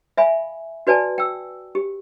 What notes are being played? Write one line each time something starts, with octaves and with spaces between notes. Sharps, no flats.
E5 F5 G#5 B5
F#4 B4 D5 G#5 A5
G5 E6
G4